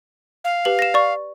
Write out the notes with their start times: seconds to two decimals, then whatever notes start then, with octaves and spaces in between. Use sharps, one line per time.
0.44 F5
0.65 G4 B4 F#7
0.79 A#6 E7
0.94 D5 C#6